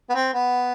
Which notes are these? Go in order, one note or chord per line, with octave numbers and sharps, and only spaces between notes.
B3
C4
B3